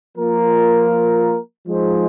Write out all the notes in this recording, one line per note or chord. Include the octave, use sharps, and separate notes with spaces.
F3 A#3 F4 A#4
F3 G#3 D#4 G#4 C5